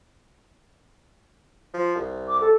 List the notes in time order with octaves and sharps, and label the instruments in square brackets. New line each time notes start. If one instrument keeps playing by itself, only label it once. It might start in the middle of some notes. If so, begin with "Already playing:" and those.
[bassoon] F3
C2
[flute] D6
A4